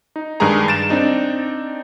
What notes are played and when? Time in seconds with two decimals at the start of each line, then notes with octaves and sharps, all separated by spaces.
0.16 D#4
0.40 G2 D#3 G#3 G4 G#4 A#5
0.68 A6 D7 E7
0.90 C4 D4 D#4